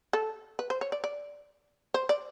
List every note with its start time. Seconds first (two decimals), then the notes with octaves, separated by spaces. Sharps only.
0.13 A4
0.59 B4
0.70 C5
0.81 C#5
0.92 D5
1.04 D5
1.94 C5
2.09 D5